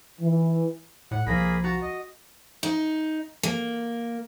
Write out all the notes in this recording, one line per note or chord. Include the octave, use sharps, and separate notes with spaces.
E3
A2 F#5
C2 F3 A#3 G#4 B5 A#6 B6
F#4 A5 A#5
D#5
D#4
A#3